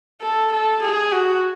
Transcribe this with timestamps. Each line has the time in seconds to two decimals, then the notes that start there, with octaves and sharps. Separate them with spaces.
0.22 A4
0.52 A4
0.82 G#4
1.12 F#4